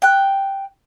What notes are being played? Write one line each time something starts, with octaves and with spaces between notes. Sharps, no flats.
G5 F#6